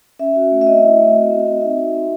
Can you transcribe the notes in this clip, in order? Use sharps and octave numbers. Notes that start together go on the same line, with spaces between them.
C#4 E5
F#4
A3
E5
C4 D#5
E4
A3
F#4
C4
C4
D#4 E5
F#4
C4